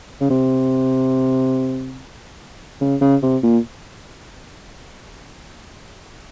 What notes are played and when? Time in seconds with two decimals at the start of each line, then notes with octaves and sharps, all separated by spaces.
0.21 C#3
0.30 C3
2.81 C#3
3.01 C#3
3.23 C3
3.43 A#2